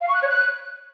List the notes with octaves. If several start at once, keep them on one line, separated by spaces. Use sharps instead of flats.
F5
C#6
F#6
C#5
F#6